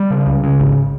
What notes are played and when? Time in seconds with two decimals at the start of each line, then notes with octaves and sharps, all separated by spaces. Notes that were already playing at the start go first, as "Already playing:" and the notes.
Already playing: G3
0.11 C#3
0.27 C#2
0.44 C#3
0.60 G#1